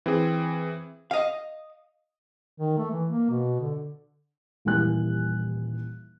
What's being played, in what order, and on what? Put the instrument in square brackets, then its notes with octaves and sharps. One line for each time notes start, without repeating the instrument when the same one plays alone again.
[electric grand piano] E3 C4 G#4
[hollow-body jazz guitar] D#5 F5
[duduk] D#3
A3
E3
A#3
B2
D3
[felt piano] D#1 E3 G3 A#3 G#5 F#6